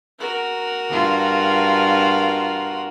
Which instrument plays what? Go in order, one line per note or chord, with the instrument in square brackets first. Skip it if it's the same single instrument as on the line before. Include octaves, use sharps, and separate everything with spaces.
[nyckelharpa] F#4 A#4
[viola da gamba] G2 F4